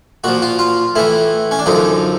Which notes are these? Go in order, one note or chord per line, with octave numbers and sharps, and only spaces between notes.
A#2 F3 F#4
F4
F4
A2 E3 E4
C#4
D4
F#2 D3 F3 D#4